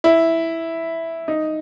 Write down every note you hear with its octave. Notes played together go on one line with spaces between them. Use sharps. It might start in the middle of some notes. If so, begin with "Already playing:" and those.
E4
D#4